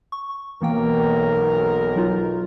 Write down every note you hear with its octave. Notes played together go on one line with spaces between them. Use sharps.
C#6
B1 E3 A#3 A#4 G5
F#3 D#4 F4